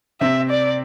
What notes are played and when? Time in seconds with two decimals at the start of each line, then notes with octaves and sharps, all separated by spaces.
0.21 C3 C4 E5
0.50 D5